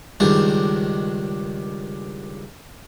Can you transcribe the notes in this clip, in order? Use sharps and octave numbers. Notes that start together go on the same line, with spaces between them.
C#2 G2 D#3